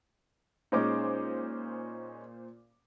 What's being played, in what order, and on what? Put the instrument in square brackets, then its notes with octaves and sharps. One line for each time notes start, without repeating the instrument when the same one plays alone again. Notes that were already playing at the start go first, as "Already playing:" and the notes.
[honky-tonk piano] A#2 C5 D6 [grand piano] G#3 C#4 D#4